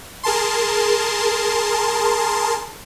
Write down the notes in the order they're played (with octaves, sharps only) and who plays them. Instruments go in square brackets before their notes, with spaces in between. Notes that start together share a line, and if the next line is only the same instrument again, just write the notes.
[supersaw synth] G#4 A#4 A5 C6